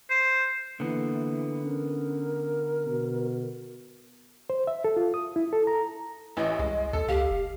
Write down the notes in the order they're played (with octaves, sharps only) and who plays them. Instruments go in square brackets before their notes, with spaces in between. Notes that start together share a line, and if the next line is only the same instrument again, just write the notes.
[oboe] C5
[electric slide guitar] D3 B3 [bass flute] E3 [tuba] A#3
[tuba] C#4 [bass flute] A#4
[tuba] B2
[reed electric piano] C5
E5
A4
F4
D#6
E4
A4
A#5
[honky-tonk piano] A1 E3 [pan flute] D#5
[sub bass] C2 [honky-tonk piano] G#3
[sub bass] D#2 [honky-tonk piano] A4
[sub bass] C#2 [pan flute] G4 [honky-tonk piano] F5
[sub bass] F1